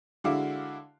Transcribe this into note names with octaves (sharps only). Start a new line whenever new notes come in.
D3 G#3 E4 F#4 F5 D6